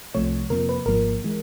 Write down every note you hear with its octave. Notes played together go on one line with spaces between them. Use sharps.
C2 C3 F3 A3 C#5
F2 C3 F3 A#3 A#4
B4
G#1 G#2 F3 A#3 A#4
E3 G#3